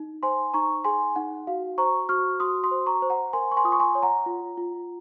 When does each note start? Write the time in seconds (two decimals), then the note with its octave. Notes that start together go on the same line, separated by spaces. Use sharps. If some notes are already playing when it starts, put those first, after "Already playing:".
Already playing: D#4
0.23 C5 G#5 C6
0.53 D#4 A#5 C#6
0.84 G#4 G#5 C6
1.16 D#4 F#5
1.47 F#4 F5
1.78 C5 A#5 C#6
2.09 F#4 C#6 F6
2.40 F#4 C6 D#6
2.63 C6 D#6
2.71 C5
2.86 A#5 C#6
3.02 C5
3.10 F#5 A#5
3.33 A#4 G#5 C6
3.52 C#6
3.57 G#5 C6
3.64 F4 D#6
3.72 C#6
3.80 G#5 C6
3.95 C#5
4.03 F#5 A#5
4.26 F4
4.57 F4